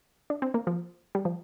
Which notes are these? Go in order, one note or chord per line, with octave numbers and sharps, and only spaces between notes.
D4
C4
A#3
F3
G3
F3